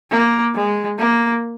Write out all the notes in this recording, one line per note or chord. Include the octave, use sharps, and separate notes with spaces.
A#3
G#3
A#3